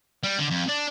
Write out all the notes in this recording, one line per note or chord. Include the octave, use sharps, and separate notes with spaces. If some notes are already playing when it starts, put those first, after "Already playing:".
G3
D3
F2
D4